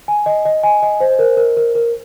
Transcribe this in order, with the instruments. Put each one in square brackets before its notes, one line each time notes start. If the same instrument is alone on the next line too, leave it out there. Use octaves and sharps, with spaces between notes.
[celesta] G#5
D#5
D#5
G#5
D#5
C5
A#4
A#4
A#4
A#4